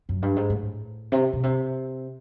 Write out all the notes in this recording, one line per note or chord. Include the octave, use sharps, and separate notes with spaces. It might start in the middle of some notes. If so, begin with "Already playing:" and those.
F#2
G2
G#2
A2
C3
B2
C3